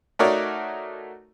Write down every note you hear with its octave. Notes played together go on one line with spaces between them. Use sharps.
A3 D#4 F#4 A#4 C#5 D5